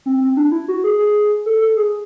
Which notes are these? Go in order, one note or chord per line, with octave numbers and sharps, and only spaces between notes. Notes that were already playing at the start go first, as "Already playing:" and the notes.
C4
C4
D4
E4
F#4
G#4
G#4
A4
A4
G#4